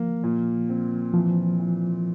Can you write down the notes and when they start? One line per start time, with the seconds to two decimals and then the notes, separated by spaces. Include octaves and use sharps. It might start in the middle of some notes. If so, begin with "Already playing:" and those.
Already playing: F3 A#3
0.24 A#2
0.69 C4
1.14 E3 F3
1.60 E3